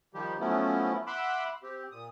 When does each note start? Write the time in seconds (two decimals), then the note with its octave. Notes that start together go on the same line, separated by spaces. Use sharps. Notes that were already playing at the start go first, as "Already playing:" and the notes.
0.14 D#3 F3 G3 G4
0.40 F3 F#3 A3 B3 C#4 E4
1.07 E5 F#5 B5 C6 D6 E6
1.63 C4 G4
1.92 A#2 D#6